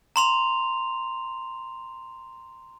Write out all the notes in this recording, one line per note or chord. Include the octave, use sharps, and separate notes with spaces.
A#5 C6 F7